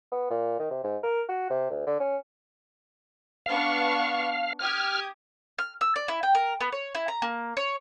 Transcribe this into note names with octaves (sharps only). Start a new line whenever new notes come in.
B3
A#2
D#3
C3
G#2
A#4
F#4
C3
D2
D3
C#4
B3 D4 F5 C#6
G4 D#6 F6 G#6
F6
E6
D5
E4
G5
A#4
B3
C#5
E4
A#5
A#3
C#5